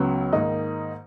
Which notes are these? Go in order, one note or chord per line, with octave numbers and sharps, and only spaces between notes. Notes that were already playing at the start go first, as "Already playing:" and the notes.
Already playing: C#2 C#3 F#3 B3
G#2 D#3 A#3 D#4